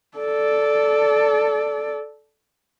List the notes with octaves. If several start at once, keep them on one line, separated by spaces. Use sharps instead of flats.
A4 D5